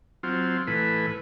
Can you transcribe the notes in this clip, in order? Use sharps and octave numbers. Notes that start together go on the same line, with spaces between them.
F#3 C4 F4
A2 E3 B4